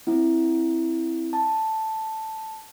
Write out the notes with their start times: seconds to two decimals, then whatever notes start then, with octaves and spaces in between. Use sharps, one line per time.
0.07 C4 E4
1.33 A5